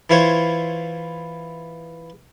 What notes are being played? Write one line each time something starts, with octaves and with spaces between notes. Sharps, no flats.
E3 E4 F4 C5 C#5